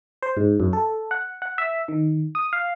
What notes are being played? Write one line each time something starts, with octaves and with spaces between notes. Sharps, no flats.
C5
G#2
F#2
A4
F#5
F#5
E5
D#3
D#6
F5